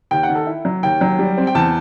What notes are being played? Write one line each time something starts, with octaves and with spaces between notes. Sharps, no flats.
D#2 G5
F#5
D#3
A4
E4
F#3
D#2 G5
F#3
G3
C4
G5
E2 A5